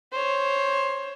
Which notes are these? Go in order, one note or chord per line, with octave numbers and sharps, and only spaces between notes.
C5 C#5